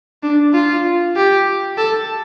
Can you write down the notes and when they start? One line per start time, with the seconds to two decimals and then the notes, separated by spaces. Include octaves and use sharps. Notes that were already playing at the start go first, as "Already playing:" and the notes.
0.23 D4
0.54 F4
1.16 G4
1.78 A4